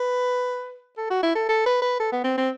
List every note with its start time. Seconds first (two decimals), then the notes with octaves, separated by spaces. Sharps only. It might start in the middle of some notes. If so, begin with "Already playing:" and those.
Already playing: B4
0.97 A4
1.10 F#4
1.23 E4
1.35 A4
1.48 A4
1.66 B4
1.82 B4
1.99 A4
2.12 B3
2.24 C4
2.37 C4